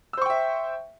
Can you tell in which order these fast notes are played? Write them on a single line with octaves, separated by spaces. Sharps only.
E6 C5 C#6 G5 E5